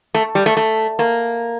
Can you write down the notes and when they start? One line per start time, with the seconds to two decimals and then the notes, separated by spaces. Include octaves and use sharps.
0.15 A3
0.35 G3
0.46 A3
0.57 A3
0.99 A#3